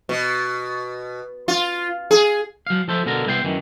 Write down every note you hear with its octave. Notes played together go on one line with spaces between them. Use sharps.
B2
F4
G#4
F#3 F5
F3 A4 C5 E5
B2 D3 A4 A#4 A#5
C2 B3 E4 G5 G#5 C6
F#2 D#3 E3